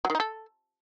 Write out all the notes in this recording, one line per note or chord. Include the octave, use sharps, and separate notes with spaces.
F#3
D#3
D#4
A4